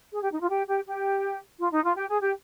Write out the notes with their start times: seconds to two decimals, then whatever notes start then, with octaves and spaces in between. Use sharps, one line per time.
0.11 G#4
0.21 G4
0.31 D#4
0.40 F4
0.48 G4
0.67 G4
0.86 G4
1.59 F4
1.71 D#4
1.83 F4
1.96 G4
2.09 G#4
2.21 G4